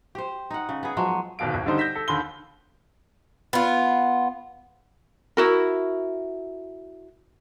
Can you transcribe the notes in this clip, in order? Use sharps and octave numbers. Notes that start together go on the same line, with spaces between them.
G4 C5
D#4 F#5
C#3
B3 G#4
F3 F#3 G#3
D1 D#2 B2 F5 D7
G#1
D3 D#3 G3 D#4 C5
G6 A#6 B6 E7
A4
D#2 D3 B5 C6 G7
B3 F4
E4 F#4 A#4